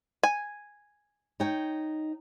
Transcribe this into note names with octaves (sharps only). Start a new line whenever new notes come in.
G#5
D#4 C#5 G5